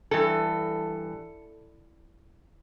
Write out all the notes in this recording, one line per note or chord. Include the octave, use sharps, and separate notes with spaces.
G2 E3 A4